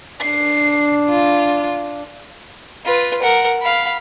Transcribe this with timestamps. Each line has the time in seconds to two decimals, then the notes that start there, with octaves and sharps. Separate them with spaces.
0.21 D4 C7
1.09 F4
2.86 F4 B4
3.22 A#4 F#5
3.62 F5 B5